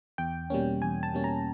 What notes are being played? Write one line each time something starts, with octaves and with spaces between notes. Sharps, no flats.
E2 G5
B2 G3 A#3 C#4
E2 G#5
A5
B2 G3 A#3 C#4
A#5